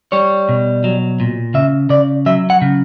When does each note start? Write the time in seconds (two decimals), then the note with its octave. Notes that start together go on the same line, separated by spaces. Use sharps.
0.12 G3 C#5
0.49 B2
0.84 F#3
1.20 A#2
1.54 C#3 E5
1.90 C#3 D5
2.26 F#3 E5
2.50 F#5
2.62 C#3